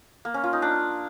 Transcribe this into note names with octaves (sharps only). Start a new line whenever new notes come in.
A#3
C#4
F4
D#4
D4